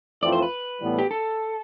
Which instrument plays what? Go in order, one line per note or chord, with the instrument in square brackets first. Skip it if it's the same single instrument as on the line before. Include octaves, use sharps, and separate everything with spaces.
[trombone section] F2 E3 A3 C4 F4 [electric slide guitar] D5
[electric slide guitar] C5
B4
[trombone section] A2 E3 G3 B3
[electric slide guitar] G4
A4